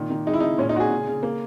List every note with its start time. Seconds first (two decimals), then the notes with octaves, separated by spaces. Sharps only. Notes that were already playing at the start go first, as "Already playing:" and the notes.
Already playing: A#2 D#3
0.10 D#3
0.26 G#3 D#4
0.33 E4
0.40 C#3 D#4
0.58 A#2 C#4
0.69 D#4
0.75 A#2 F#4
0.80 G#4
0.91 C#3
1.07 C#3
1.23 A#3